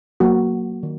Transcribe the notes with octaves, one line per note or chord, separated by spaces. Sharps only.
F#3 A#3 F#4
D#3